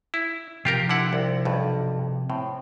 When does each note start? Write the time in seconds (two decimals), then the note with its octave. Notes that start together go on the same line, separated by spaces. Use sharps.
0.14 E4
0.65 C3 F3 F4 G4 A#4 G5
0.89 D3 E4 F#5
1.13 C2
1.45 B1 G2
2.30 A2 C4